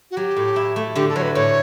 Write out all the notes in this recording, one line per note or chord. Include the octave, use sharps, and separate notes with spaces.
F#4
F#3 G4
A2
E4
A3
D3 G4
A4
F#3 C#5
B4
A2 C#5